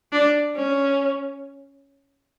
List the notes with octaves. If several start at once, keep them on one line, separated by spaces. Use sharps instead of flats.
D4
C#4